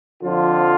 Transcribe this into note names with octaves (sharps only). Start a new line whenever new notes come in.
F2 D3 F3 F4